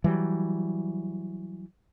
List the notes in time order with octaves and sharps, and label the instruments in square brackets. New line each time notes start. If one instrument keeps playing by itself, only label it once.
[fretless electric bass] E3 F#3 G3